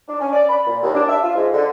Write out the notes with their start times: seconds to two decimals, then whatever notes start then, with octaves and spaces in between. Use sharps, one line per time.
0.09 D4
0.20 C#4
0.33 D5
0.49 B5
0.67 A#2
0.83 D#2
0.94 D4
1.09 E5
1.23 F4
1.36 G#2
1.54 D3